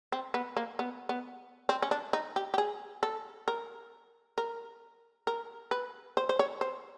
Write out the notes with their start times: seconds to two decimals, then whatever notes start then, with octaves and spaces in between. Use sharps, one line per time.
0.12 C4
0.34 B3
0.57 A#3
0.79 B3
1.09 B3
1.69 C4
1.82 C#4
1.91 D4
2.13 D#4
2.36 G4
2.54 G4
2.58 G#4
3.03 A4
3.48 A#4
4.38 A#4
5.27 A#4
5.71 B4
6.17 C5
6.29 C5
6.39 C#5
6.61 C5